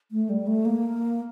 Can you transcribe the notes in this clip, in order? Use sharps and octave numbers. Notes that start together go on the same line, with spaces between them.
A3
G3
A3
A#3